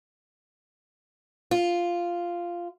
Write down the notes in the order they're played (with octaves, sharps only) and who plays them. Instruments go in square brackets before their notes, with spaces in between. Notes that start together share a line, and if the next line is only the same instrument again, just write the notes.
[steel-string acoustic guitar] F4